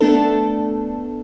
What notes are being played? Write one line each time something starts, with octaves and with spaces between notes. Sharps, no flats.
A3 B3 D4 A4